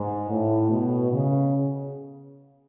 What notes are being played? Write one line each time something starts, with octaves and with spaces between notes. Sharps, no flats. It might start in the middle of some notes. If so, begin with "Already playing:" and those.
Already playing: G#2
A2
B2
C#3